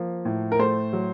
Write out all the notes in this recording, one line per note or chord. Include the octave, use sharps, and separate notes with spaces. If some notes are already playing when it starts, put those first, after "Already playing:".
Already playing: F3 A#3
A2
A#4
A3 C5
F#3